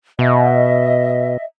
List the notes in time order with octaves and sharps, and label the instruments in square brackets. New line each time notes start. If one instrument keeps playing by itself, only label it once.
[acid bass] B2 [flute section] D#5 E5